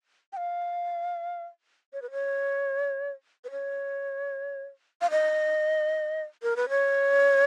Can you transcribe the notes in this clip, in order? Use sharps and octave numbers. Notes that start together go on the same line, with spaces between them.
G5
F5
C#5
B4
C#5
B4
C#5
F5
D#5
A#4
B4
C#5